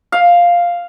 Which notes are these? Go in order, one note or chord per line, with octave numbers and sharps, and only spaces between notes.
F5